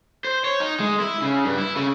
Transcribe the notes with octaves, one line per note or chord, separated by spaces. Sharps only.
C5
C#5
D#4
G#3
E4
C#3
G2
E4
C#3